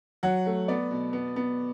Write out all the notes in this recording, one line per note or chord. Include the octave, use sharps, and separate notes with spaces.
F#3 F#5
A3
B3 D5
B2
B3
B3